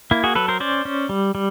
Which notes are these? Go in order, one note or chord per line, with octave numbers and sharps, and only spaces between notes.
A#3 E4
F#4 G#4
F#3 A4 B4
A#4 C5
C#4 C5 D5
C#4
G3
G3